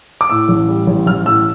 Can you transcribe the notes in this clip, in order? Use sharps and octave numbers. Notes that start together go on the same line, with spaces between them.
D6
A2 E6
A1
G3
A1
A1 F6
A2 E6